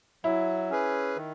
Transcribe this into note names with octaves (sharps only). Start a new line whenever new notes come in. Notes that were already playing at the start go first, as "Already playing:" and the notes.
F#3 E4
C#4 G#4 B4
D#3